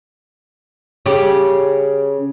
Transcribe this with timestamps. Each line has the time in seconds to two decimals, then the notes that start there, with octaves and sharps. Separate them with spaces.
1.06 C#3 G4